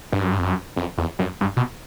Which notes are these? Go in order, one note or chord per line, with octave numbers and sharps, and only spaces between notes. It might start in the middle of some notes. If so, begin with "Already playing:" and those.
G2
F#2
G2
F2
F#2
F2
E2
F#2
G2
B2